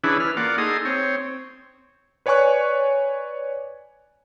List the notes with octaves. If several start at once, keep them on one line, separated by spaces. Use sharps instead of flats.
E3 C#4 D4 E4 G#4 B4
B4 F6
A#3 F4 D5 F#5
D#4 G#4 A4 C6 D#6
C4 C#5
B4 C#5 D5 G#5 C#6 F#6